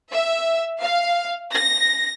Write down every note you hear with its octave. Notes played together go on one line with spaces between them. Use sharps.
E5
F5
A#6